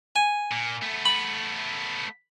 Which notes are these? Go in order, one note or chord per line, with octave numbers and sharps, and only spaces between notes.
G#5
A#2
A3 B3
B5